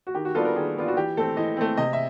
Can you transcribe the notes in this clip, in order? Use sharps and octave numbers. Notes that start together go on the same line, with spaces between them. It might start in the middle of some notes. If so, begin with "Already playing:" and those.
F#4
D#3 G4
F#4
G3 B3 D4 F4 A4
A#4
D#3 G#4
G3 B3 D4 F4
F#4
E3 G4
A3 C4 A4
E3 D#5
A3 C4
C3 D#5
E5